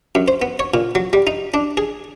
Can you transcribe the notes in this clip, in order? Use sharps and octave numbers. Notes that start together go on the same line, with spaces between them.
F#2
C5
B3
C#5
A#2
F#3
G3
D#4
D4
G#4